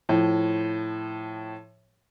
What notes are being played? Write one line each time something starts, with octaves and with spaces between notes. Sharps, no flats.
A2 F3